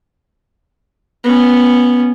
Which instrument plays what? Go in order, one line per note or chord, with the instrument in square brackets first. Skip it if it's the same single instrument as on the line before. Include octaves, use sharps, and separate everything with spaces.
[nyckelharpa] B3 C#4